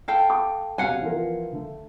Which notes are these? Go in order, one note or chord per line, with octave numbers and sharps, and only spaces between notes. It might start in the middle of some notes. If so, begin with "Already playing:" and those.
A4 F5 G5
F#5 D6
E1 F#2 C3 F5 F#5 G#5
E3 F3 A#4
D3 A3